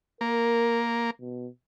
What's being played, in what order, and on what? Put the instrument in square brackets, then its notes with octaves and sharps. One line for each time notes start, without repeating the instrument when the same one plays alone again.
[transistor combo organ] A#3 [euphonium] A#4
[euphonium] B2